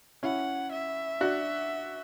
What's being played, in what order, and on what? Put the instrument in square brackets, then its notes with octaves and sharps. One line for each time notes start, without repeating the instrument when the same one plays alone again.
[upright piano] C#4 E4 [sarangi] F#5
[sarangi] E5
[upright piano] D4 F#4